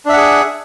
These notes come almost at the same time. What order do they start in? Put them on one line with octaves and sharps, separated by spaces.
D4 E5 F#5 G#4